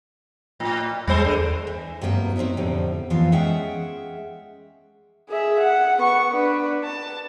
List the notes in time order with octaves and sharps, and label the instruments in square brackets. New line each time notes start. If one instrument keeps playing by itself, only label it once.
[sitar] A2
[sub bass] E2 [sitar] G3 G#3 C5
[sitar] D3
[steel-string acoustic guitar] E3
G2 C3 F#3 A#3 B3
F#3 C4 C#4 D#4 E4
F2 A2 D3 G3
F2 E3 F3 B3 F5
G#3 C#4 G#4 E5 F#5 G5
[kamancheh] G#4 E5
F#5
B3 C#6
D4 B4
A5